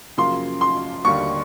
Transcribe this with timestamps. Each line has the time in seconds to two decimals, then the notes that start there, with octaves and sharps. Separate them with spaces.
0.17 F#2 C#3 F3 A#3 C6
0.61 C6
1.05 D#2 D3 G3 A#3 C#6